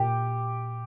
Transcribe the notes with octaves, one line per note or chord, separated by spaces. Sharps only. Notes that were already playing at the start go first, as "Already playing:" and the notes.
Already playing: A#2 G4